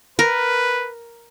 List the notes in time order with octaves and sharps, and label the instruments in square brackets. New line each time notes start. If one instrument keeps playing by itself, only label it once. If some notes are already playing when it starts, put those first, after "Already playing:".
[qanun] A#4 [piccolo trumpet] B4